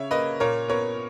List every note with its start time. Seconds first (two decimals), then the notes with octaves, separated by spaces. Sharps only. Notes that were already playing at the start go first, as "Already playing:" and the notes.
Already playing: C#3 C#5 E5
0.11 A#3 B4 D#5
0.40 A#2 A#4 C#5
0.68 B3 A#4 C#5